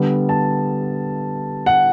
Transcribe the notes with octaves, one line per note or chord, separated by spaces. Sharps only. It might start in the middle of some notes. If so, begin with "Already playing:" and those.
Already playing: D3 G3 B3
A5
F#5